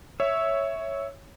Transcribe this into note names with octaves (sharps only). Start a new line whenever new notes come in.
C#5 E5